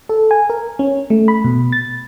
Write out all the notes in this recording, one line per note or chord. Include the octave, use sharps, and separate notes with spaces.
A4
G#5
A#4
C#4
A3
B5
B2
A6